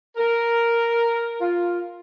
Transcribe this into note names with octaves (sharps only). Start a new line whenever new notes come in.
A#4
F4